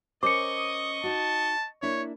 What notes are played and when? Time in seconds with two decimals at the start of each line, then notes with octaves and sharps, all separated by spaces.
0.23 C#4 A#4 C5 D#5 C#6 D6 C#7
0.58 D#6
1.04 D#4 F#4 A5
1.82 A#3 D4 E4 C#5